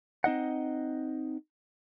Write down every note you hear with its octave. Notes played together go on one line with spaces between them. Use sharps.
C4 D#4 D#5 F#5